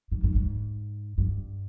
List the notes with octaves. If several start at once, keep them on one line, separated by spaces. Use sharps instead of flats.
G#2
G#2
G#2
G2